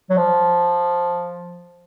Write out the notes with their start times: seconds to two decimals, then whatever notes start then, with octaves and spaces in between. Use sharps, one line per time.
0.10 F#3
0.17 F3